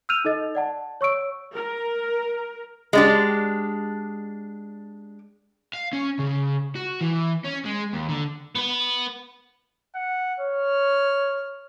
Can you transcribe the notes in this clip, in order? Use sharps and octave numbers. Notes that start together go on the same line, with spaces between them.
E6 F6 G6 D#7 F7
D#4 A4 D#5 A6
D5 F#5 A5
C#5 C#6 E6 D7
A#4
G#3 D4 G4
F5
C#4
C#3
F#4
E3
C#4
G#3
D#2
D3
B3 B4
F#5
C#5 F6